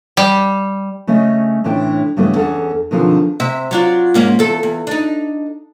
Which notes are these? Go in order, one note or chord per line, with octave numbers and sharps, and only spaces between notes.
G3
C#3 A3 C#4 D#5
A2 C3 E3 C#4 D4 G5
G2 C#3 E3 G3 A3 B3
E2 C#4 G#4 A4 F#5
B2 D3 D#3 F3 C4 G#4
C3 E5
F#3 D4 F4
G#2 A#3 C#4
E2 A4
E2
D4 D#4